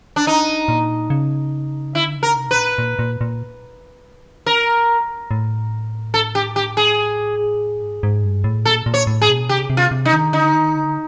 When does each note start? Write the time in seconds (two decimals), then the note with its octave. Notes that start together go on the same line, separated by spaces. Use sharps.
0.16 D4
0.27 D#4
0.68 A#2
1.10 C#3
1.95 D3 E4
2.16 C#3
2.23 A#4
2.36 C3
2.48 B2 B4
2.57 A#2
2.78 A#2
2.99 A#2
3.21 A#2
4.46 A#4
5.31 A2
6.14 A4
6.35 G4
6.56 G4
6.77 G#4
7.82 G#2
8.03 G#2
8.24 G2
8.44 A2
8.65 A#2 A4
8.86 A#2
8.94 C#5
9.07 A2
9.21 G#4
9.29 B2
9.49 C3 G4
9.70 C3
9.77 F4
9.91 C3
10.05 D#4
10.13 D#3
10.33 D3 D#4
10.54 D#3
10.75 D3